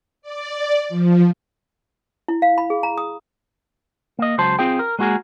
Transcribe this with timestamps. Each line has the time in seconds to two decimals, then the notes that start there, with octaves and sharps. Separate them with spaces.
0.22 D5
0.89 F3
2.28 E4
2.42 F5
2.58 B5
2.70 G#4
2.83 A#5
2.98 D#6
4.19 A#3 D#5
4.38 C#2 F#3 C5 A5
4.59 C4 F4 G#4 G5
4.79 A#4
4.99 G#3 A#3 F#4 G#4 A#4